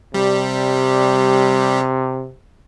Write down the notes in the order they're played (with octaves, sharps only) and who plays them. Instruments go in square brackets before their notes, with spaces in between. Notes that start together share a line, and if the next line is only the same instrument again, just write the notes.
[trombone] C3 [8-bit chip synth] G3